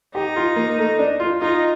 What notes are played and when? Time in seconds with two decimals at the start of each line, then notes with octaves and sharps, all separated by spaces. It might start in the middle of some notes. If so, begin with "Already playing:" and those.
0.14 D#4 G4
0.36 F4
0.56 A#3
0.78 A3
0.99 D4
1.20 F4
1.41 D#4 F4